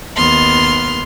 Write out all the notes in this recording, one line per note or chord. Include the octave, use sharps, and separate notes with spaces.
D#2 B3 C6 F6